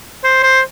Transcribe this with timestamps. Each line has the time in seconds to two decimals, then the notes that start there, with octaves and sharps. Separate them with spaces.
0.24 C5
0.43 C5